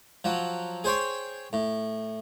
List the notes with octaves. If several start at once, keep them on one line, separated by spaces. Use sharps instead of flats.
F3 F#3
G#4 C5 C#5 G5
A2